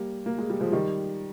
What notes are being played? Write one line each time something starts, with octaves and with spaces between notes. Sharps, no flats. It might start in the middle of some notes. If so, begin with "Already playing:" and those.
Already playing: G3 A#3
A#3
G#3
G3
F3 G#3
D#3 G3